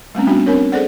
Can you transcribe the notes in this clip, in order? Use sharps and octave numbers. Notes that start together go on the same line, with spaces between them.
G3 A3 C4 C#4
G3 B3 D4 F#4
C4 D4 A#4 C#5
G#4 A4 C5 D5 F#5